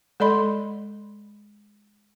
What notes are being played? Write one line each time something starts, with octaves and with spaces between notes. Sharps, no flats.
G#3 A4 D5 D#5 B5 C6